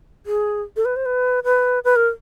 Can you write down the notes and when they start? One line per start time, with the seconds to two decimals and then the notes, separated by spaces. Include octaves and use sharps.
0.26 G#4
0.76 A4
0.85 B4
0.96 C5
1.06 B4
1.44 B4
1.84 B4
1.96 A#4